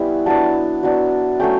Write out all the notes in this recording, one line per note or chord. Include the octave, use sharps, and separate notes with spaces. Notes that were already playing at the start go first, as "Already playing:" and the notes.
Already playing: G3 B3 C#4 E4
F#3 B3 D4 A5
F#3 B3 D4
F#3 A3 C#4 G5